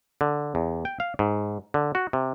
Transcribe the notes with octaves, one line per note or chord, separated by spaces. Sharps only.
D3
E2
G5
F5
G#2
D3
F#4
C3